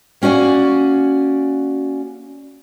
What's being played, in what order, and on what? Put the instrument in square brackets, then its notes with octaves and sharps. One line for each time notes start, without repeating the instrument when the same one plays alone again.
[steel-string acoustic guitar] A#3 C#4 F#4 D5 G#5